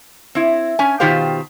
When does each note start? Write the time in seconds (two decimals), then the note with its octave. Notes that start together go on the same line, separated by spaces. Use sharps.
0.35 C4 E4
0.79 C#4 G#5
1.00 B2 D#3 F4 G4 C5 F5